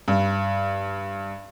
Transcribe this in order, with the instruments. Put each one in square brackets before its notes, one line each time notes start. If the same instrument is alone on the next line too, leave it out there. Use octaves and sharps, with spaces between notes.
[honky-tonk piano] G2